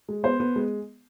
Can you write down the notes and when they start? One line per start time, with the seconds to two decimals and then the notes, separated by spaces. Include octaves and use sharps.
0.09 G#3
0.24 B3 C5
0.40 B3
0.56 G#3